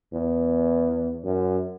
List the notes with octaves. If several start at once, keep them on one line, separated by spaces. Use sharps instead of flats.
E2
F#2